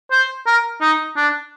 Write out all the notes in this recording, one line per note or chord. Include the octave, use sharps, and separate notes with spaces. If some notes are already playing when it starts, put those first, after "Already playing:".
C5
A#4
D#4
D4